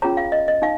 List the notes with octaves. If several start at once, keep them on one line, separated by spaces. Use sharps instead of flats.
C#4 F4 G#4 C#5 A#5
F5
D#5
D#5
D#4 F5